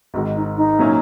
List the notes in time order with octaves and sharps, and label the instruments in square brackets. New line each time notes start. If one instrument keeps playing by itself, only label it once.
[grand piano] G#1 G#2 D#3 [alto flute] F#4
[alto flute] D#4
D#4
[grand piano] A#2 F#3 C#4 E4